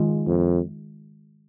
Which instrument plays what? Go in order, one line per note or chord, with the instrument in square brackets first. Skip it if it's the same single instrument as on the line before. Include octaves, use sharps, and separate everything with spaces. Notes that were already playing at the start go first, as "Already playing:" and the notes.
Already playing: [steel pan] D#3 G#3 F4
[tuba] F2